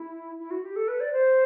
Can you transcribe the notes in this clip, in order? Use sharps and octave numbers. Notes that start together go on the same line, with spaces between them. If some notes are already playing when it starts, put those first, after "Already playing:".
Already playing: E4
E4
F#4
G4
A4
B4
D5
C5